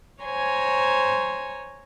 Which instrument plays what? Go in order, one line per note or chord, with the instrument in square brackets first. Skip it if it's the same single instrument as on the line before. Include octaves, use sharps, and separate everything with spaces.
[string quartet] C5 C#5 G#5 A#5